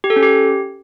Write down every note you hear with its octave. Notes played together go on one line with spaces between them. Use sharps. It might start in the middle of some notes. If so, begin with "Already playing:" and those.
G4
A4
C#4
G4